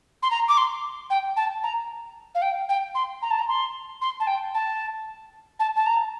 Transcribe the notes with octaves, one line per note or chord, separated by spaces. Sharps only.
C6
A#5
D6
C6
G5
A5
A#5
F5
G5
G5
C6
A#5
A5
A#5
C6
C6
A5
G5
A5
A5
A5
A#5